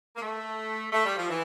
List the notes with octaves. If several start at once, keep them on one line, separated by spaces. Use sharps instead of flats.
A#3
A3
A3
G3
F3
E3